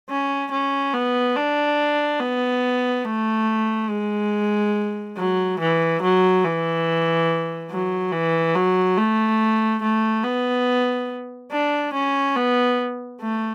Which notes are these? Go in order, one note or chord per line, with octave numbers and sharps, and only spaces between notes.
C#4
C#4
B3
D4
B3
A3
G#3
F#3
E3
F#3
E3
F#3
E3
F#3
A3
A3
B3
D4
C#4
B3
A3